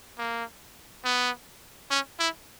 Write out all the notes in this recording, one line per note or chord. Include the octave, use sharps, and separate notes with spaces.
A#3
B3
C#4
E4